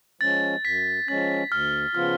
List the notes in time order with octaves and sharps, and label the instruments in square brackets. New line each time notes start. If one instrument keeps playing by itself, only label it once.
[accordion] F3 G#3 C#4 [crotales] A6
[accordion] F#2 [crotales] B6
[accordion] F3 G#3 C#4 [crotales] A6
[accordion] D2 [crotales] F6
[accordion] C#3 F3 B3 F4 [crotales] F6